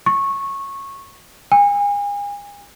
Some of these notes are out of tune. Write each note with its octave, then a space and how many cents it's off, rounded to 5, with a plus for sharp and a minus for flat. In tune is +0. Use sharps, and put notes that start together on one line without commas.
C#6 -15
G#5 -35